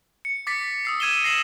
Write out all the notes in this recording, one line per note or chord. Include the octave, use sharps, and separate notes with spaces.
C#7
D6 A6 B6 C#7
D#6 E6 C7
E6 G#6 D#7 E7 G7
A#6 C7 E7 F#7